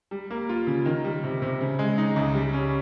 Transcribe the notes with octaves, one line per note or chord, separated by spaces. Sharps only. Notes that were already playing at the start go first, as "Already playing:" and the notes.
G3
A#3
F4
C#3
D#3
G3
C3
C3
C#3
G#3
D#4
C#2
G3
C#4